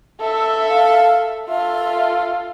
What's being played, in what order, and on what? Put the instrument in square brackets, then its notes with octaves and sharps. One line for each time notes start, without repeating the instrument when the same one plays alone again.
[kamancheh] A4 E5
[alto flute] F5
[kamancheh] F4 A4 [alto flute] E5